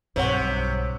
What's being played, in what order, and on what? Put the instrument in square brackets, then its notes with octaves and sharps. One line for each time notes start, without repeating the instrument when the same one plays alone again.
[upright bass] B1 G2 [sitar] C3 [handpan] C5 C#5 F#5